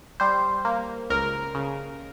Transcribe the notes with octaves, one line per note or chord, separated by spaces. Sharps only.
G3 C5
A#3
C#2 A#4
C#3